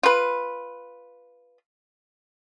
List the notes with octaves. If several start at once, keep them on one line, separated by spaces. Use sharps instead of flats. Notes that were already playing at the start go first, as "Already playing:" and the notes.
F4 B4